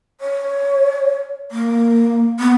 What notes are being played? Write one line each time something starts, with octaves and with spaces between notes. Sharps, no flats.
C#5
A#3
B3